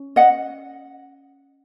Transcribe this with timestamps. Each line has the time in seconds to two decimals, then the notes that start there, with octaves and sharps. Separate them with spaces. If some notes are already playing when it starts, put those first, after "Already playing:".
Already playing: C#4
0.16 D#5 F#5